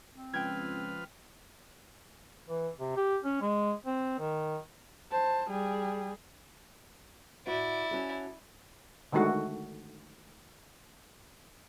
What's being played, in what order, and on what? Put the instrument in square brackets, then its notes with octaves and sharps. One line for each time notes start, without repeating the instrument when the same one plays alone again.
[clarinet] C4
[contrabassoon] C#2 [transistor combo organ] F3 B4 F6 [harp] G5 G#6
[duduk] E3
C3
G4
C#4
G#3
C4
D#3
[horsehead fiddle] C5 A5
G3 G#4
[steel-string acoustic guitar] A2 F#4 [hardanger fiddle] E4 D5
[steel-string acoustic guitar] C#4 F#4 A4
[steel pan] D3 D#3 G#3 A3 F#4